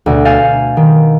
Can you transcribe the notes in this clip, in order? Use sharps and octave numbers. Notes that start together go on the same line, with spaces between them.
D2 B2
F5 G#5 G6 A6 D#7 E7
D#3